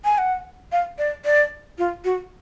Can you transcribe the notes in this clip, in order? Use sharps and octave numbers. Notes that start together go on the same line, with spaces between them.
G#5
F#5
F5
D5
D5
F4
F#4